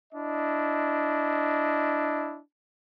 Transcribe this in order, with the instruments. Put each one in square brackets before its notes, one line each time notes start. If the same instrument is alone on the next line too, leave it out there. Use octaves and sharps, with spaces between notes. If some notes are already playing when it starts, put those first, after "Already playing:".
[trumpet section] D4 E4 D#5